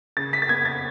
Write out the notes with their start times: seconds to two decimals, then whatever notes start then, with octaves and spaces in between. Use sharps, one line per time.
0.17 C#3 A6
0.33 B6
0.42 A6
0.49 B3 G#6
0.65 A6